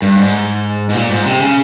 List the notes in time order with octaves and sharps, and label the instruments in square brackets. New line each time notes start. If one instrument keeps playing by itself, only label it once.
[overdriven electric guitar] G2
G#2
G#2
A#2
G#2
C3
C#3